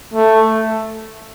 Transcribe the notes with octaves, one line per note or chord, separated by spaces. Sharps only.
A3